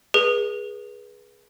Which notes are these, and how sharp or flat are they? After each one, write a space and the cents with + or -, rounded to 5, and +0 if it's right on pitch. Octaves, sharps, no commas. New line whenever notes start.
G#4 +0 B4 -30